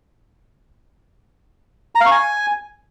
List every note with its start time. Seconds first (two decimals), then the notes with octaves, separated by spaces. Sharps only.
1.95 A#5
2.01 F5
2.06 C#6
2.11 G#5